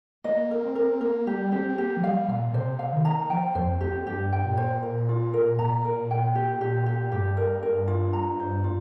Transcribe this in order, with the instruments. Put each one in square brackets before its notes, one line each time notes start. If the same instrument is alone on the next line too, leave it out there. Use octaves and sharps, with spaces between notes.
[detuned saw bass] A#3 [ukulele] D#5
[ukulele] A#4
[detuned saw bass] C4
[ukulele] A#4
[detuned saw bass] A#3 [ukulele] A#4
[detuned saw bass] G3 [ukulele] G4
[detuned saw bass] C4 [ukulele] G4
[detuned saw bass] C4
[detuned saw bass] A#3 [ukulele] G4
[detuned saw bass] F3
[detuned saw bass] G3 [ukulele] F5
[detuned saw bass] A#2 [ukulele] F5
[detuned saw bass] A#2
[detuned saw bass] C3 [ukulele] C5
[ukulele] F5
[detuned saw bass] D#3
[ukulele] A#5
[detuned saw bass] F3 [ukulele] G5
[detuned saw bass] F2 [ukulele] C5
[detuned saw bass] F2 [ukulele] G4
[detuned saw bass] G2 [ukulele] G4
[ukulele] G5
[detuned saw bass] A#2
[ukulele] C5
A#4
F4
A#4
[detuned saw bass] A#2 [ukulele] A#5
[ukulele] A#4
G5
G4
G4
G4
[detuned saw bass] G2 [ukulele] G4
[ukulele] A#4
A#4
F4
A#5
C5
F4